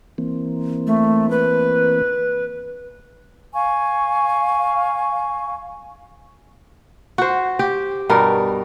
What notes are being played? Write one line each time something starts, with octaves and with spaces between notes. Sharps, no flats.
E3 A#3 C4
A3
B4
F5 G#5 C#6
F#4 C5
G4
G2 B2 G3 A#4